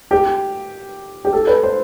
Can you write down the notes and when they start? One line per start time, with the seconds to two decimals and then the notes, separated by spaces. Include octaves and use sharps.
0.11 G4
1.25 G4
1.33 A4
1.47 B4
1.63 C5